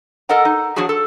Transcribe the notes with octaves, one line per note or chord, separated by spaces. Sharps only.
A4 A#4 D#5 F#5 A#5
D#4
F3 F#3 D4 F#4 G#4
A4